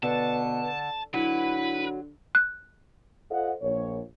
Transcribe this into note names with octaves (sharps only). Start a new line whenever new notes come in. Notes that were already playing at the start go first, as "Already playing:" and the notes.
B2 D3 B4 A5
D3 F#3 E4 B4
F#6
F4 A4 C5 D#5 F5 F#5
A#1 C#5